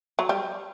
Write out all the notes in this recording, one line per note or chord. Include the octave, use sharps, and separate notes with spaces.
F#3
G3